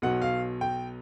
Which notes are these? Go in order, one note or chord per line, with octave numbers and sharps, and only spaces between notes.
B1 B2 F#3 F#5
F5
G5